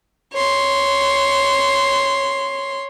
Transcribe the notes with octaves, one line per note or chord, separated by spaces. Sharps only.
C#5 C6